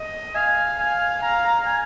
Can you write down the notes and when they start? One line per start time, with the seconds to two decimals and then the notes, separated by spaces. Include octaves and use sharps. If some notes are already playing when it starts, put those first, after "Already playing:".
Already playing: D#5
0.35 F5 G#5
0.79 F5 G#5
1.01 G#5
1.22 F5 A#5
1.44 A#5
1.66 G#5